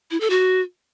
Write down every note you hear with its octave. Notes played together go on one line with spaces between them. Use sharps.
E4
A4
F#4